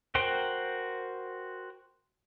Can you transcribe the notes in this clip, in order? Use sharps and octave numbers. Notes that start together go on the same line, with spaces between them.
F#4 A#4 C5 G5 C6